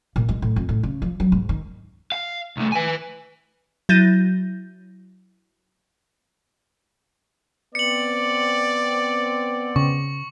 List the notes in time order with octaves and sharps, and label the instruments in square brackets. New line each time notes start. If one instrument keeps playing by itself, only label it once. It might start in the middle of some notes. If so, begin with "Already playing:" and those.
[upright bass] A#2
G#3
A2
F2
A2
C#3
F3
F#3
G#2
D#3
[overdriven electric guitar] F5
C2 A3
B4 G#5
[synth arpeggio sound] F#3 E4 G6 A6 A#6 D#7
[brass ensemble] B3 C4 [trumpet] D5 [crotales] C#7 F#7
[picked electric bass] C#3 [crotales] C#6